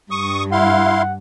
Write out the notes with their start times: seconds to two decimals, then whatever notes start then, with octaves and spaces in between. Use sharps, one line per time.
0.11 G2 C#6 D#6
0.52 E4 F5 F#5 C6